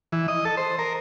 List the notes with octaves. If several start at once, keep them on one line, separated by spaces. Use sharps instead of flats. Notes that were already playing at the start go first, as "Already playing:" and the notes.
E3
D#5
A4
C5
A#4